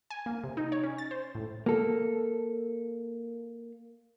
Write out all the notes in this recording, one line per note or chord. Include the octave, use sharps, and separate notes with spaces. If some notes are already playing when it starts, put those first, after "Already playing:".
G#5
A#3
C3
D#4
C#5
C#4
A6
C5
A2
A#3 A4